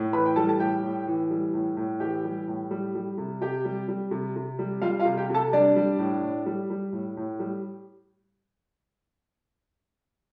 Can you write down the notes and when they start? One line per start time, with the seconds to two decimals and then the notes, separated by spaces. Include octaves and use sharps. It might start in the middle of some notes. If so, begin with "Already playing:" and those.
Already playing: A2
0.13 E3 B4 B5
0.26 G5
0.36 G3 A4 A5
0.49 A5
0.60 A2 G4 G5
0.83 A2
1.07 E3
1.31 G3
1.54 A2
1.77 A2
2.00 E3 G4 G5
2.24 G3
2.48 A2
2.71 G3
2.95 G3
3.18 C3
3.41 C3 G4 G5
3.65 G3
3.88 G3
4.11 C3
4.36 C3
4.59 G3
4.82 G3 F4 F5
4.99 F4 F5
5.05 C3
5.17 G4 G5
5.30 C3 A4 A5
5.53 G3 D4 D5
5.76 G3
5.99 A2
6.23 A2
6.46 G3
6.70 G3
6.93 A2
7.17 A2
7.40 G3